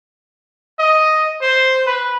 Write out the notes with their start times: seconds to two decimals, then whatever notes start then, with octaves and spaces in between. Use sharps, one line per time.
0.79 D#5
1.41 C5
1.86 B4